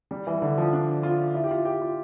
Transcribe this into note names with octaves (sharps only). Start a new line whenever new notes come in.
G3
E3
D3
F3
D4
F4
E4
G4
F4
G4
F4